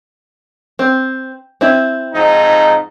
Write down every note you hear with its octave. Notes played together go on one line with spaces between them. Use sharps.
C4
C4 E4
F2 G#2 D#4